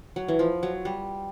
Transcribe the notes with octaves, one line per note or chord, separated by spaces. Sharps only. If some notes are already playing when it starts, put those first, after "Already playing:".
F#3
E3
F3
F#3
G3